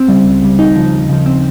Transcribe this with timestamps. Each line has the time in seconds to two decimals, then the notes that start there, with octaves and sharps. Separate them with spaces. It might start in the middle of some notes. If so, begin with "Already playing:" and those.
Already playing: C4
0.08 C#3 G3
0.26 C#2
0.42 C#3 G3
0.58 D#2 D#4
0.76 C#3 F3
0.93 D#2
1.09 C#3 F3
1.26 C4